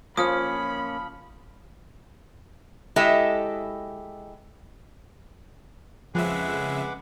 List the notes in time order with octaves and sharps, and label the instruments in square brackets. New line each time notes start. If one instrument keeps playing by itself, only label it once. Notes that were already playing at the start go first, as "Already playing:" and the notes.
[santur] F3 [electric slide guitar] A#3 C#4 [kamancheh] B5 [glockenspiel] D#6 F6
[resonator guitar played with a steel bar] G#3 E4 G4 A4 D#5 E5
[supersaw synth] F2 C#3 E5 [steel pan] F3 [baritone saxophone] G#3 [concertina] B4 F#5 D6